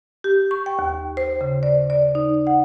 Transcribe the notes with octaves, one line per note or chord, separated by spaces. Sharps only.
G4
C#6
G5
D#2
C5
C#3
D5
D5
D#4
F#5